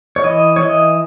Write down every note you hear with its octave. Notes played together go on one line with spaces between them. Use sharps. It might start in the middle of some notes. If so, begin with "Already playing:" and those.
C#5
E3 D#5
C#5
E3 D#5